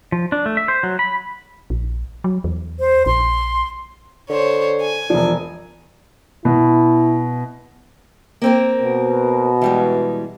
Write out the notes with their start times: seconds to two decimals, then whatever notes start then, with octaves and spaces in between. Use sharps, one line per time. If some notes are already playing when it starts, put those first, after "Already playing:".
0.12 F3
0.32 D4
0.46 A3
0.57 E5
0.68 C5
0.83 F#3
0.99 B5
1.70 A#1
2.24 F#3
2.44 E2
2.80 C5
3.06 A#1 C6
4.30 D3 C5 C#5
4.81 G#5
5.10 E1 F3 D4
6.45 B2 E4
8.42 A#3 C4 A#4
8.81 B2
9.62 E3 G3 G#3